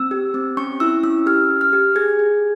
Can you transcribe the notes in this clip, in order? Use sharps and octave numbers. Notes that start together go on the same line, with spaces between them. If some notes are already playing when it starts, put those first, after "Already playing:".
Already playing: C4 E6
G4
C4
C#4 C#6
E4 E6
C#4 E6
G4 F6
G4
F6
G4
G#4 G#6
G#4